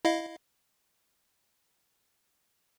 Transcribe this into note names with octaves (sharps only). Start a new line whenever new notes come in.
E4 D#5 F5